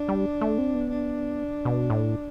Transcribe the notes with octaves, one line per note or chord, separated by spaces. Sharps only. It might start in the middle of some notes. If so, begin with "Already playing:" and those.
Already playing: D4
G3
A3
C4
B3
D4
B2
A2